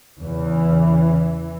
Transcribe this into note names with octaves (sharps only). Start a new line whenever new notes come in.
E2 C#3 E3